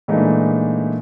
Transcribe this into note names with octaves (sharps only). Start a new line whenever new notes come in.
A#2 E3 G#3 A3 D4 D#4